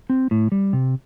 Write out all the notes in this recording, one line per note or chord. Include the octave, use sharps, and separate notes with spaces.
C4
A2
G3
C3